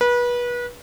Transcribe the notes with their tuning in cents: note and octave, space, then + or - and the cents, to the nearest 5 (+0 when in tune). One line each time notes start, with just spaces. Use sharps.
B4 -30